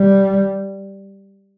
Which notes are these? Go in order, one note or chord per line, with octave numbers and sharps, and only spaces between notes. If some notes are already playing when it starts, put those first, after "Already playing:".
Already playing: G3